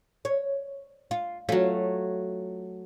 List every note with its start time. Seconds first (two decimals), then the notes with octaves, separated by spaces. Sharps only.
0.25 C#5
1.11 F4
1.49 F#3 A3 C#4 F4